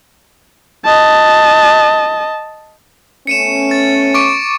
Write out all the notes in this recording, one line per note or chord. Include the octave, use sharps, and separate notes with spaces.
D#5 A5
A3 B3 C#4 C#7 D#7 E7
A6
C#6 D6 D7